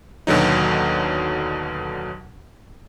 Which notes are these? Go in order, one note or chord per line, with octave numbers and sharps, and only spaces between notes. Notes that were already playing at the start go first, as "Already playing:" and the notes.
D#2 B2 D3 F#3 D#4